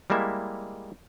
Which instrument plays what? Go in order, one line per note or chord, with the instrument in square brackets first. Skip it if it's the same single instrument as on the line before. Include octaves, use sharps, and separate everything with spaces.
[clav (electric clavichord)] G3 G#3 A#3 E4 E5